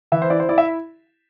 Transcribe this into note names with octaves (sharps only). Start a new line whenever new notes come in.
E3 E5
C5
E4 D5
C5
E4 D5
E5